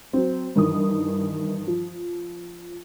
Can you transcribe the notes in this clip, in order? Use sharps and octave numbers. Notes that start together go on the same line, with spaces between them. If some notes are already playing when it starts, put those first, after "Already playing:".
F#3 C4
G2 D#3 E3 D#6
F3